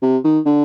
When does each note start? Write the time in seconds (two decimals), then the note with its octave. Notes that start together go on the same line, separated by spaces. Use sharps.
0.02 C3
0.24 D#3
0.46 D3